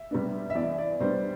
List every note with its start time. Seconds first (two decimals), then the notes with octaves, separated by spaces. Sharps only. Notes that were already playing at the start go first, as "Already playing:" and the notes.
Already playing: E5
0.11 C3 G3 B3 D4
0.50 E5
0.55 E2 D5
0.78 D5
1.00 C3 G3 B3 D4 C5